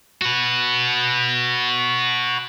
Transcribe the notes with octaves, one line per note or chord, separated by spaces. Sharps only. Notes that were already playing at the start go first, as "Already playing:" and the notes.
F#4 B4